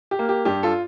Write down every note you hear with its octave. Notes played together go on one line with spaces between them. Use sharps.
G4
A#3
G4
G2 G4
F4 A4